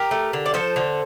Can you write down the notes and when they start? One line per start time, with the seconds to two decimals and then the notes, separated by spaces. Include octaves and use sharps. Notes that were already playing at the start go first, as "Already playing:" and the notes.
Already playing: G4 A#4
0.11 A3
0.33 D3
0.46 D5
0.54 F3 A4 C5
0.76 D3